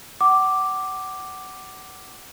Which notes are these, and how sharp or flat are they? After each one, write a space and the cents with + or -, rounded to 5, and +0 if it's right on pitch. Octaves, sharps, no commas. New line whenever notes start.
F#5 +30 D6 +0